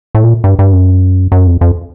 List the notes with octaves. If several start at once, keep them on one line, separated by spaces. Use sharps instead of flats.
A2
A#2
G2
G2
F#2
F#2
F2
F2